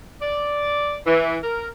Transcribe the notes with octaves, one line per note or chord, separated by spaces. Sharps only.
D5
E3
A#4